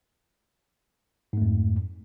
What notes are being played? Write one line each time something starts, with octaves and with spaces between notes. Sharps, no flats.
F2 G#2 A3